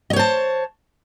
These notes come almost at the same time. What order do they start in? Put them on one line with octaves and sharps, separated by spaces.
D#5 C#5 C5 A5